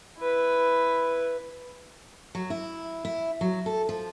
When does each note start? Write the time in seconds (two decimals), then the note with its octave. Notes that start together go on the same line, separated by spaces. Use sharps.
0.20 E4 B4
2.35 F#3
2.50 E4
3.05 E4
3.41 F#3
3.66 A4
3.89 F3